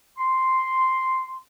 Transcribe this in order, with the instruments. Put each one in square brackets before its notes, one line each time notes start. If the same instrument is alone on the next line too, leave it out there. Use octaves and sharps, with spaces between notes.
[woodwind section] C6